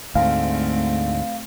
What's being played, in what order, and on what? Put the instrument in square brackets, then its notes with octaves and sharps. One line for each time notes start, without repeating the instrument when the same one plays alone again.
[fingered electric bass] D2 G#2 [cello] A3 C4 [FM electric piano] F5